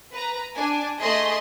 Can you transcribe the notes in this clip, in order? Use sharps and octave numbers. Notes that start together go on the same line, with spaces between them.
B4 A#5
D4 G#5
A3 G#4 D#5 C6